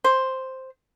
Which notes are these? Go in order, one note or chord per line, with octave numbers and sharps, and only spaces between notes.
C5